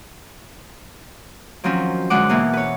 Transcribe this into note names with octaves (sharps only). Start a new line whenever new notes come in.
D#3 F3 F#3 C4 C#4
F#2 D3 G#3 F#5 D6
B2 E3 A#3 E4
B4 C#5